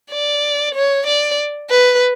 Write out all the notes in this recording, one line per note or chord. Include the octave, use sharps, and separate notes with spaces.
D5
C#5
D5
B4